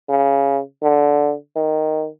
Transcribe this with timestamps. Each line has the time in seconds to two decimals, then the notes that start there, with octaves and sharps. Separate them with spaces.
0.09 C#3
0.82 D3
1.56 D#3